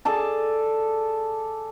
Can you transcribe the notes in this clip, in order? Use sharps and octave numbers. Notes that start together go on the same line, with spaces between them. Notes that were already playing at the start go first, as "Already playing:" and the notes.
G#4 A4 D5 A5